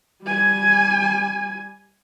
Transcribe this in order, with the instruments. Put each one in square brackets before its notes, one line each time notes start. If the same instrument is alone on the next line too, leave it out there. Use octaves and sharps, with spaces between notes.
[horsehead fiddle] G3 G#5